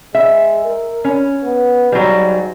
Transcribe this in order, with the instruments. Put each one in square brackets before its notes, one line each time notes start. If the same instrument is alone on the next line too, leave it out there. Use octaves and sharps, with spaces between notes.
[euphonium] G#3 [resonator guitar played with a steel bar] E5
[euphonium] A#4
[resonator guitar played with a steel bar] C#4
[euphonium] B3
[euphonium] G#2 [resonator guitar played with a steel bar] F#3 G3